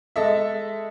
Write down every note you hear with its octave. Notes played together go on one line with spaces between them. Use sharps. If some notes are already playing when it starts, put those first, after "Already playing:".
G#3 A4 D#5 E5